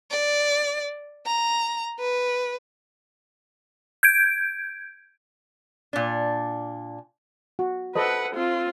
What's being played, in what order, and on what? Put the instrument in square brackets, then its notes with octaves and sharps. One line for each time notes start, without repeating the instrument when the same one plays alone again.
[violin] D5
A#5
B4
[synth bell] G6 G#6 D7
[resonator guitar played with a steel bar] A#2 D4
[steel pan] F#4
[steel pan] A4 C5 D#5 [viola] B4 F#5
[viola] C4 F4